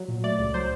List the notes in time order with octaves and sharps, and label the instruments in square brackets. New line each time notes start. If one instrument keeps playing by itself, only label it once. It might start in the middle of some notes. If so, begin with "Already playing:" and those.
Already playing: [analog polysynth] F#3
A#2
A3 D5
C#2
F#3 C5